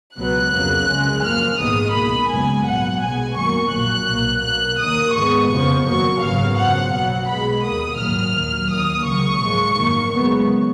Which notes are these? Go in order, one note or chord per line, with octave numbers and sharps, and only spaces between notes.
C#2 B2 F#3 B3 F#6
F2 C#3 F#3 A#3
C#2 C#3 G#3
F#2 F3 A#3 F6
A#1 G#2 D#3 G#3 B3 D#6
C#2 B2 A#3 B5
F#2 C#3 G#3 B3 G#5
A#1 G#2 F#3 F#5
B1 B2 G#3 B3 G#5
F#2 D#3 F#3 A#3 C#6
A#1 A#2 F#3 A#3 F#6
B1 B2 A#3
B1 B2 A#3 F#6
D#2 D#3 A#3 D#6
G#2 D#3 G#3 B3 C#6
F2 C#3 F3 B3 C#6
F#2 D#3 F#3 A#3 C#6
G#1 F#2 C#3 F#3 B3 F5
F#2 C#3 F3 F#5
B1 A#2 F#3 B3 F#5
B1 B2 G#3 B3 B5
D#2 D#3 A#3 D#6
A#1 G#2 D#3 F#3 A#3 F6
D#2 D#3 F#3
D#2 D#3 A#3 D#6
C#2 C#3 F#3 C#6
A#1 G#2 F3 G#3
G#1 F#2 D#3 A#3
F#2 C#3 G#3 B3